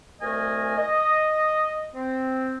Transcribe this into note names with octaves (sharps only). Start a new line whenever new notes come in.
C2 A3 A#4 D#5 G#5
D#5
C4